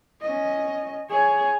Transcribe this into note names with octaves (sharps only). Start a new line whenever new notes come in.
C#4 D#5
G#4 C#5